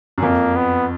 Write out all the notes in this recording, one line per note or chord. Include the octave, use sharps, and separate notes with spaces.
F#2
F2 A#3
B3